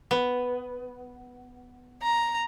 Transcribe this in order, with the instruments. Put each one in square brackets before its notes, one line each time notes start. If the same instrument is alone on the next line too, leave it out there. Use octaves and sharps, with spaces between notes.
[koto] B3
[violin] A#5